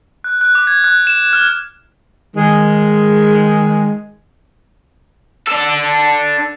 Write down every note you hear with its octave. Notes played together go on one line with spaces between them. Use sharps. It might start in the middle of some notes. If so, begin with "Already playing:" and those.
F#6
F#6
D6
G#6
F#6
E7
F6
D#3 G#3
D4 A4